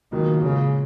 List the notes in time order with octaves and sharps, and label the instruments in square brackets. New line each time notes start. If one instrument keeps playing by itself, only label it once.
[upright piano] C#2 B2 F#3 A#3 F4 [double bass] D#3
[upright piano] A#2 G#3 C#4 F4 [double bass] C#3